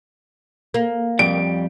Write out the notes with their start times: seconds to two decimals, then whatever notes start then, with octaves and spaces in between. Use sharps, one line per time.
0.74 A#3
1.19 F2 G3 D7